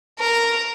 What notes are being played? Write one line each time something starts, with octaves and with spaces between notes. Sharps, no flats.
A#4